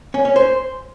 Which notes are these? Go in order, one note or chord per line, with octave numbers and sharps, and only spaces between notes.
C#4
C#4
C5